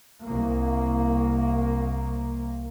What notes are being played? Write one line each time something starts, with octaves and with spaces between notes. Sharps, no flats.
C2 A#3